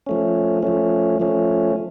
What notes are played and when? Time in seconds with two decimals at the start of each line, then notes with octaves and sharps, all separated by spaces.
0.07 F3 A3 C#4
0.63 F3 A3 C#4
1.20 F3 A3 C#4